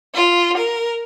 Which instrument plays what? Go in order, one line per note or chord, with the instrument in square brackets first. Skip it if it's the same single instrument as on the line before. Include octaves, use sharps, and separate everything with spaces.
[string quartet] F4
A#4